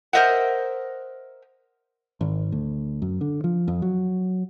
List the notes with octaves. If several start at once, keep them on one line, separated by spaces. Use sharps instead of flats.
A#4 C5 D#5 E5 F#5
G#1
D2
F#2
D3
F3
F2
F#3